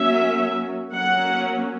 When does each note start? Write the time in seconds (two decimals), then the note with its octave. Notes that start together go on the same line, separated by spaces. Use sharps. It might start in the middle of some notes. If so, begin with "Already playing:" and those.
Already playing: F#3 A#3 C#4 E5
0.91 F#3 A#3 C#4 F#5